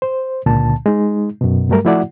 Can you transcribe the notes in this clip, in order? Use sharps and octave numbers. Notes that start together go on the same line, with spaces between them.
C5
C#2 A#2 D3 A5
G#3 D#4
F#2 B2
G2 F#3 G3 A3 A#4
F3 A3 E4 F#4 D5 F#5